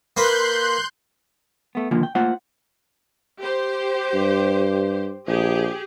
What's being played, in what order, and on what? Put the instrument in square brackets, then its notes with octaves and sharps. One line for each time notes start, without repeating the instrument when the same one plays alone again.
[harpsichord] A#3 B4 [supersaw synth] C6 F#6 G6
[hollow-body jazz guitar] A3 B3
D#2 A#2 D3 F3
G5
A3 A#3 F4 C5 F#5
[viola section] G4 C5
[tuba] G2
[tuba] A#1 [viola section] G4 G#4